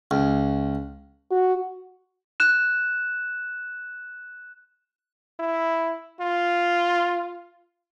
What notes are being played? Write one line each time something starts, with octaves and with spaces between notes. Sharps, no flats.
C#2
F#4
F#6 E7
E4
F4